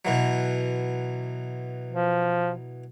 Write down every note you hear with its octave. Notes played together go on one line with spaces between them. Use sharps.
B2 E3 F#3
F3